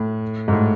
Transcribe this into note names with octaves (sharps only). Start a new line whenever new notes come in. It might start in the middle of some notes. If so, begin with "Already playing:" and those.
Already playing: A2
G#2
A2